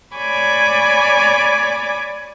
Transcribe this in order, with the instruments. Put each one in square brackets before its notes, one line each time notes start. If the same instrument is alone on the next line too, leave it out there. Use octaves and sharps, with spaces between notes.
[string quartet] C#5 D5 G#5 B5 D6